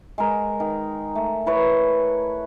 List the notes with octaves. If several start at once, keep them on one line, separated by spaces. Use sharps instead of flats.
G#3 A#4
D#3
A3
E4 B4 C#5